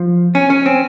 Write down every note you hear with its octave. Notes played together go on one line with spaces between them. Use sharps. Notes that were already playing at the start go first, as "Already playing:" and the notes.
Already playing: F3
C#4 G#5
C#4
C4